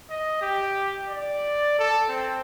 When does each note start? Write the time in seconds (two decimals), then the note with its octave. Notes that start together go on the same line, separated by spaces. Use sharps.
0.10 D#5
0.42 G4
1.10 D5
1.79 A4
2.09 C4